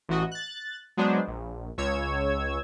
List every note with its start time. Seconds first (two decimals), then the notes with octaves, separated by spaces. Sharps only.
0.09 A1 E3 F#4 D#5
0.31 F#6 A6
0.97 F#3 G#3 B3 D4 C5
1.27 A#1
1.78 C#2 C#5 E6 G#6